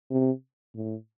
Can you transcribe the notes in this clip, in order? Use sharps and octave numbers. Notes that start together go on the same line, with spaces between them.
C3
A2